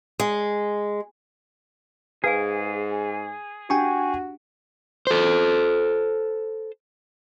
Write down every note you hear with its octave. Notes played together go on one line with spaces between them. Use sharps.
G#3
G#2 G#4 B4 F5 G#5
D4 F#4 G4 G5 G#5 C#6
A4 C5